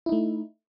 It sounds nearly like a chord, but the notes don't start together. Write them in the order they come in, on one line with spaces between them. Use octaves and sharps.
E4 D#4 A3